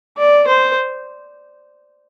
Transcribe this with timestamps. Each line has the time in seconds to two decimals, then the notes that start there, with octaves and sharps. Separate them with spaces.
0.17 D5
0.47 C5